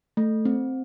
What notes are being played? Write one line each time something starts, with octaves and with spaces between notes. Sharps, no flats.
A3
C4